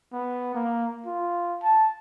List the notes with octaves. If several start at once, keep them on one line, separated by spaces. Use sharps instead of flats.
B3
A#3
F4
A5